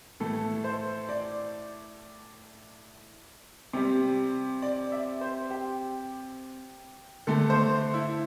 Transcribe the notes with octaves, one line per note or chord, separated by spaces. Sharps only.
A2 E3 A3 A4
C5
D5
C3 G3
D5
E5
C5
G4
D3 A3 A4
C5
E4